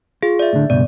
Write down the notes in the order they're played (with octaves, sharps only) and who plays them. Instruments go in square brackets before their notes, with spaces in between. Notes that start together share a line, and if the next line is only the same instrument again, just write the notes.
[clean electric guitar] F4 [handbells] G#4
[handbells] D5 E5
[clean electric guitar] A2 D3
[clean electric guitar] C#2 G2 B2 [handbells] D5